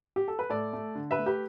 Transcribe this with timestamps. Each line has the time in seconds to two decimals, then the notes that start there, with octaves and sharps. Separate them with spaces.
0.16 G4
0.28 A4
0.39 B4
0.50 A2 A4 D5
0.73 A3
0.95 D3
1.11 B4 E5
1.19 A3
1.26 G4 B4